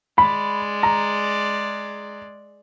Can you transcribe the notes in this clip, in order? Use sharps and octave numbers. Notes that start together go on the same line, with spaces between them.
G#3 D5 B5
A#5